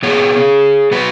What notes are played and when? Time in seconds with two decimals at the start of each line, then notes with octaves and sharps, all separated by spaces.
0.03 B2 B3 G#4 C#5
0.91 B2 F#3 B3 F#4 B4